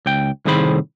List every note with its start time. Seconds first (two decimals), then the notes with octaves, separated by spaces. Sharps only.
0.06 C#2 G5
0.45 C2 A2 D#3 G#4 C5 B5